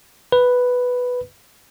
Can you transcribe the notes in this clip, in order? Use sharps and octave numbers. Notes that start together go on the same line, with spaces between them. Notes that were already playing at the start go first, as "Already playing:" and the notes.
B4